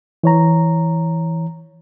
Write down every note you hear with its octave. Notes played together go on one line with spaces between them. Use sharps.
E3 C#5 A#5